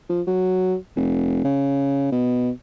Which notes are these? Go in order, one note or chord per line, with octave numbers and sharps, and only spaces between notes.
F3
F#3
F1
C#3
B2